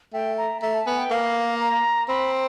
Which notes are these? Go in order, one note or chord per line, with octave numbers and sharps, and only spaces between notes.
A3 G5
A#5
A3 A#5
A5
B3 G#5
G5
A#3 F5
A#5
C4 B5